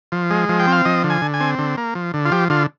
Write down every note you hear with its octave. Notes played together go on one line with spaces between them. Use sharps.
F3
G#3
F3
G5
C4
F5
F3 D#5
D3
G#5
D3
G#5
C4
D3
A#3
F3
D3
F4
F3 G4
D3 F4